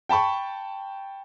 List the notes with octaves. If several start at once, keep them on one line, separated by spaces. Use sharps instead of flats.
G5 A5 B5 C#6